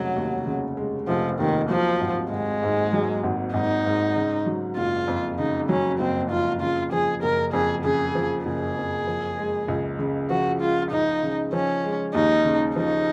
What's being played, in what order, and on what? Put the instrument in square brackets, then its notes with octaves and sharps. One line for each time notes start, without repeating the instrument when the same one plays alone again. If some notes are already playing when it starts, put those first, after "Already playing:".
Already playing: [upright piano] F1 C#3 G#3 [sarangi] F#3
[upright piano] D#2
C#3
G#3
[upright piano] F1 [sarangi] F3
[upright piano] D#2 [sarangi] D#3
[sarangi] F3 [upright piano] F#3
[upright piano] G#1
[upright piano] G#1 [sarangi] G#3
[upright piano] G#2
F#3
G#1
[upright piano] G#1 [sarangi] D#4
[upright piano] G#2
C#3
F#3
[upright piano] F#1 [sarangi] F4
[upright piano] F2
[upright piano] C#3 [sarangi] D#4
[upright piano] F#3 [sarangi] C#4
[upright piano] F#1 [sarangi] C4
[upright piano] F2 [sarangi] F4
[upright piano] C#3 [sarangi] F4
[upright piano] F3 [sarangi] G#4
[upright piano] F#1 [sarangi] A#4
[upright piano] F2 [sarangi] G#4
[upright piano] C#3 [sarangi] G#4
[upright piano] F3
[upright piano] F#1 [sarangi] G#4
[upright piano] F2
F3
G#3
C#2
C#3
[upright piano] F3 [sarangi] F#4
[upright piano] G#3 [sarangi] F4
[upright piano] C#2 [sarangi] D#4
[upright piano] C#3
[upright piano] F3 [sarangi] C#4
[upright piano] G#3
[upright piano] D#2 [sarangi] D#4
[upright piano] C#3
[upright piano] F3 [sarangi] D#4